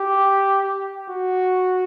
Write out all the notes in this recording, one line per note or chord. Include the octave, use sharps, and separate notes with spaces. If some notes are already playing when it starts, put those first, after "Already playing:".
Already playing: G4
F#4